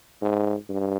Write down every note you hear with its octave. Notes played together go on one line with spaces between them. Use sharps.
G#2
G2